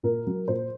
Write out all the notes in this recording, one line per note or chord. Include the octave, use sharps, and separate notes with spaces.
A#2 A#4
F#3
A#2 C5